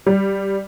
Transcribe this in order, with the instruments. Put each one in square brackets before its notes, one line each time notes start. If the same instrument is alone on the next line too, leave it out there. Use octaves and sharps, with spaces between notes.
[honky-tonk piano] G3